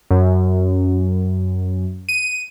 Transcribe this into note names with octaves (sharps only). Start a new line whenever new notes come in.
F#2
D#7